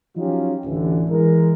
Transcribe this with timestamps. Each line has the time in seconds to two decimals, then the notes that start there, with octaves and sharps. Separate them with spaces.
0.17 F3 F#3 C#4 D#4 F4 G4
0.65 A1 D2 D3 E3
1.09 E3 G#3 A#4